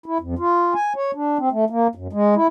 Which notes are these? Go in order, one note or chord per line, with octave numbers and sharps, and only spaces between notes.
E4
F2
F4
G#5
C#5
D4
C4
A3
A#3
F#2
G#3
E4